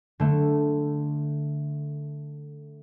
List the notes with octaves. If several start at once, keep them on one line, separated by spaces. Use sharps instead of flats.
D3 A3